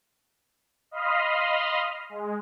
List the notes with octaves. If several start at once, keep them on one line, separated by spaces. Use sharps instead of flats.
D#5 F5 B5 C6 D#6 F6
G#3